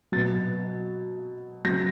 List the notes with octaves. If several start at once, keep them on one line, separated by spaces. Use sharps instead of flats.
B2 F#3 A6
C#3 F#3 A#6